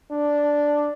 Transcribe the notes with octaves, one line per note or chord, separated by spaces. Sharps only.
D4